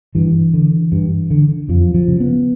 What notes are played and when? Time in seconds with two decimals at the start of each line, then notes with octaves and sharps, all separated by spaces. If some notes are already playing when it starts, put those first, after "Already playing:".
0.15 G2 E3
0.54 D3
0.92 G2
1.30 D3
1.69 F2 F3
1.94 F3
2.08 C#3
2.20 B3